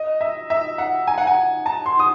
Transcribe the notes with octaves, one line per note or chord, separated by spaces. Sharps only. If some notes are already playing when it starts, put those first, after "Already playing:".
Already playing: D#5
E5
E5
F#5
G#5
F#5
G#5
A5
C6
D#6